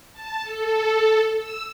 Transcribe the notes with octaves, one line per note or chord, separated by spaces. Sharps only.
A5
A4
E6